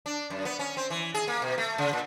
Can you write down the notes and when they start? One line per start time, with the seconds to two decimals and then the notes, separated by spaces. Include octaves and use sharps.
0.06 D4
0.30 F#2
0.45 B3
0.59 C#4
0.77 C4
0.90 E3
1.14 G#4
1.28 A#3
1.42 B2
1.58 A3
1.78 C#3
1.93 A#2